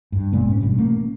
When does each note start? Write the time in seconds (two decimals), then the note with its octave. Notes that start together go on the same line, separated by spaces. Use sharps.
0.12 G2
0.32 F#1 A#2 G#3 B3
0.48 G#2 C#4
0.61 A1 G2 B2 G3
0.78 A3 A#3 C#4